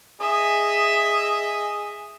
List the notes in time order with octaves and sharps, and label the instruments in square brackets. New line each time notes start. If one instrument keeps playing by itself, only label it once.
[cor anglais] G#4 [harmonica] D#5 [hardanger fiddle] E5